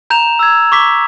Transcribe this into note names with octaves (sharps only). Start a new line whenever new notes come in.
A#5 G6 E7 F7
E6 G#6
C#6 D6 B6